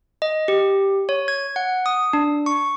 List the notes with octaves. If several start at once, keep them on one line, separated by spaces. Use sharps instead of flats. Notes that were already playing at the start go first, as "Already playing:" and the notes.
D#5
G4
C#5
G#6
F#5
D#6
D4
C#6